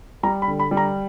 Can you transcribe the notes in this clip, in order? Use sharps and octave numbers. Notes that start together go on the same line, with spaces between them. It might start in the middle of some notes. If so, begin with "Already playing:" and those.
G3 A#5
B5
D3
B5
G3
A#5